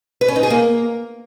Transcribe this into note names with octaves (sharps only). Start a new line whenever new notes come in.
B4
C#4
D#4
G#4
A#3